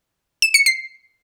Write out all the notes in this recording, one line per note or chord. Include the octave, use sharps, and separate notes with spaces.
E7
C#7
C7